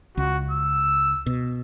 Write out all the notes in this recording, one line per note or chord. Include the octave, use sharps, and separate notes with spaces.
C#2 F#4
E6
B2